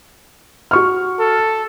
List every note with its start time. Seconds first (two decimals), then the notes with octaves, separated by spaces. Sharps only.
0.71 F#4 C#6 F6
1.20 A4